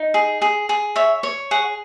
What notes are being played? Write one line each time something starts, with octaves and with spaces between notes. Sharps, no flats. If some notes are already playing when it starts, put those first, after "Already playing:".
Already playing: D#4
G#4
G#4
G#4
C#5 E5
C#5
G#4 F#5